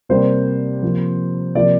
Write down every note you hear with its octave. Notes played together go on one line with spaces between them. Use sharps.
C3 G3 A#3 C5
C3 F3 A#3
C3 F3 A#3 D5